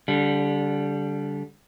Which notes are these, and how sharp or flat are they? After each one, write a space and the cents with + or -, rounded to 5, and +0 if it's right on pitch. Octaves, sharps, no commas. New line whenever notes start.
D3 -25 G3 +0